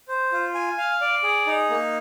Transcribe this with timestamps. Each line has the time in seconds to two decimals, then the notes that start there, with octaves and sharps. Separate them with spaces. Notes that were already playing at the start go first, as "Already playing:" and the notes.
0.08 C5
0.32 F4
0.54 G#5
0.78 F5
1.01 D5
1.23 G#4
1.47 D#4
1.70 A#3